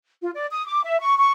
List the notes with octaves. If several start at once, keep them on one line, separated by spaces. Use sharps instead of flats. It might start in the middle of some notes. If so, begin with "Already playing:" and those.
F4
D5
D#6
D6
E5
C#6
C#6